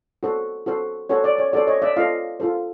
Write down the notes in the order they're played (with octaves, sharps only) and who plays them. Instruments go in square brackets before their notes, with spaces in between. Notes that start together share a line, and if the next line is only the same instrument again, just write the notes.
[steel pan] F#4 A4 C5
F#4 A4 C5
F#4 A4 C5 C#5
D5
C#5
F#4 A4 C5 D5
C#5 D#5
D5 E5
F4 A4 C5 D#5 F5
F4 A4 C5